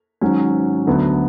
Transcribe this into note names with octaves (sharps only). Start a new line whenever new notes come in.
G#1 G#2 F#3 C#4
D2 D3 F#3 B3